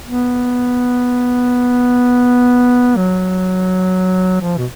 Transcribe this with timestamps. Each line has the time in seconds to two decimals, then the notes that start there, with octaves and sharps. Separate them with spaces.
0.05 B3
2.97 F#3
4.41 F3
4.58 B2